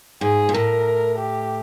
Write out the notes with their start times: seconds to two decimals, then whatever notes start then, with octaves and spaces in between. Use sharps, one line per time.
0.21 G#2 G#4
0.49 A#2
0.54 A2 A#4
1.19 G4